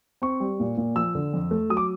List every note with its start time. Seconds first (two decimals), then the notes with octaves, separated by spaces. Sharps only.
0.22 C4 C#6
0.40 G3
0.60 A#2
0.77 A#2
0.96 F3 E6
1.15 D3
1.33 F2
1.51 A3
1.70 F#3 D#6
1.77 D6